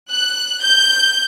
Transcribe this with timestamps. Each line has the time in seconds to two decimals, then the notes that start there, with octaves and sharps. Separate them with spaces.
0.12 F#6
0.62 G6